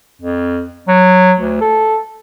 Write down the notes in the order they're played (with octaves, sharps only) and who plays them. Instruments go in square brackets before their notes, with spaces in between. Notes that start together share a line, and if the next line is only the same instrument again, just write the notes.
[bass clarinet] F2
F#3
D2
A4